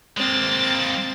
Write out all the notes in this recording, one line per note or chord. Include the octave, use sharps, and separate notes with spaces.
G#3 A#3 C4 A6